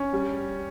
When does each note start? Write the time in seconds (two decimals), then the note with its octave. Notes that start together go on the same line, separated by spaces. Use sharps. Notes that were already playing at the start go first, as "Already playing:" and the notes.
Already playing: C#4
0.13 G3